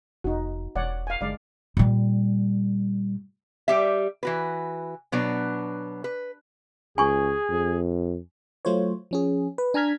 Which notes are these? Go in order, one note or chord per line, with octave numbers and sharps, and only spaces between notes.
F1 D#4 F#4
E1 C#5 D5 F#5
F5 G#5
G1 G#3 D5 F5
A#2 G3
G3 G4 E5
E3 F#4 B4
B2 F#3 B3 D4
B4
C#2 G#4 G#5 C#6
F2
F#3 A3 F4 C5 C#5
F3 C#4 G#4
B4
D4 G#5 A#5 F6 G#6 B6